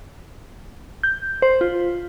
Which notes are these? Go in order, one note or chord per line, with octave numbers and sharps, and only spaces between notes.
G6
C5
F4